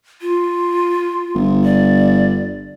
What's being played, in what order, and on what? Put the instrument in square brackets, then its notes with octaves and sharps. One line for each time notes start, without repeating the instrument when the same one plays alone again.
[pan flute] F4
[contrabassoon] G1
[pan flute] D5